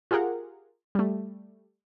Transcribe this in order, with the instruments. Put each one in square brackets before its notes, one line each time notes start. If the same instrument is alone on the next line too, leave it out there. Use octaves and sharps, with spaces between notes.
[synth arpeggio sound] F4 G4 G#4 A#4 F#5
G3 A3